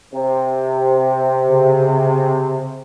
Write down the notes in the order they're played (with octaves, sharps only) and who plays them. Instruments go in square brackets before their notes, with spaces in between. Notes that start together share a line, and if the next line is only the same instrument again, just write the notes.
[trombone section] C3
[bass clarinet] C#3